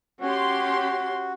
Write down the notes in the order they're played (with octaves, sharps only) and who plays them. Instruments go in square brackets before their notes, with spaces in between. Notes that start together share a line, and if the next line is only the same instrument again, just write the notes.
[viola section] C#4 G4 C6 [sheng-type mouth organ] F#4